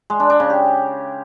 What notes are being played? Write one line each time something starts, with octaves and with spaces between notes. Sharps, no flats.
G#3
D4
D4
C#3
G4